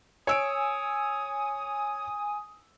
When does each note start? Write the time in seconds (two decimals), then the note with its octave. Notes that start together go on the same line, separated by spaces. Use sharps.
0.27 C#5 G#5 D#6 E6 D7